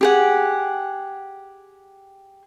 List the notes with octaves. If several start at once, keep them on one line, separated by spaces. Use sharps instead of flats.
G4 G#4 F#5